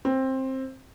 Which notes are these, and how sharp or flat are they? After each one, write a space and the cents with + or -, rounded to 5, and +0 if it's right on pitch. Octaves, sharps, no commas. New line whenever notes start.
C4 +15